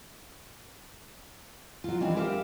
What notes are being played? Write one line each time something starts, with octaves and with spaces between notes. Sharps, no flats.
F#3 F4
D#3 E3 G3 C4 D4
G4 A#4 E5 F5 G5